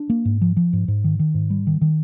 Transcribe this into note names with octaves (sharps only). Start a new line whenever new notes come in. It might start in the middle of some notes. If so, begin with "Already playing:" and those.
Already playing: D4
A#3
G#2
F3
F3
G#2
G#2
D#3
D#3
G#2
G3
D#3
D#3